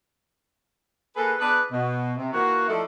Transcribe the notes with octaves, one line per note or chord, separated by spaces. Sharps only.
A#3 G#4 A4 B4
B3 D4 G#4 B4
B2
C3
E3 A#3 F4 F#4
F3 A3 D#4 E4 A4 D5